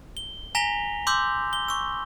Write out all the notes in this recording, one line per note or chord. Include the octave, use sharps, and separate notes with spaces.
G7
G#5 A#5 A#6 B6 F7 G7
C6 D6 E6 G6
G7
C#6 E6